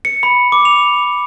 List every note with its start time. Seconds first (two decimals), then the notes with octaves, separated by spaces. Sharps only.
0.05 C#7
0.23 B5
0.52 D6
0.65 F7